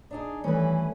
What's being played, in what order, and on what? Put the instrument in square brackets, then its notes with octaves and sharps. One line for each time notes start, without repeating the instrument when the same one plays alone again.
[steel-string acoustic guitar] D4 D#4 G#4
[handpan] D#3 G3 A3 [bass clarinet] E3 [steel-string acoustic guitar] C#4 B4